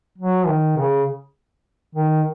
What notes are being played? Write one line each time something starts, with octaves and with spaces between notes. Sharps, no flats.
F#3
D#3
C#3
D#3